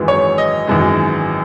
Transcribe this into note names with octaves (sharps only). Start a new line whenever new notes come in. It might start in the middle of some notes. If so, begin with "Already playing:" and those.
Already playing: G#1 F#2 E3 G#3
C#5
D#5
G#1 F#2 E3 G#3